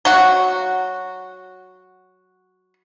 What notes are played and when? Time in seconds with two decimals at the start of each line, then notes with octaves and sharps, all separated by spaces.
0.05 F#3 F#4